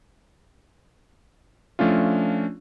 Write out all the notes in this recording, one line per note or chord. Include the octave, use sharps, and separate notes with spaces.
F3 A3 C#4 D4 F4